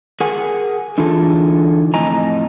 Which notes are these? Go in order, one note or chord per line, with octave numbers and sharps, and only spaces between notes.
G#4 A#4 F#5 G#5
D3 E3 D#4 F4 G#4 A4
F2 A2 D#5 G#5 A#5